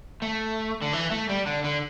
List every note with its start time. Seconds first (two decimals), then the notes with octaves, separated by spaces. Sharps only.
0.22 A3
0.82 D3
0.93 E3
1.11 A3
1.29 G3
1.46 D3
1.64 D3